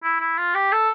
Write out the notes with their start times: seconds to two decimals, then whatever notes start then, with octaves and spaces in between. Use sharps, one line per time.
0.04 E4
0.20 E4
0.38 F4
0.54 G4
0.72 A4